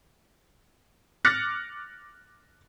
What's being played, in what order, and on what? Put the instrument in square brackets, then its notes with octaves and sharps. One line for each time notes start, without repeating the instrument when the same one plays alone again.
[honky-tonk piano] D6 F6 F#6 A6 A#6 C#7